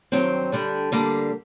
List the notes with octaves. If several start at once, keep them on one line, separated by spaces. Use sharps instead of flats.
G2 D#3 F#3 C4
D3 G3 D4
D3 G3 A#3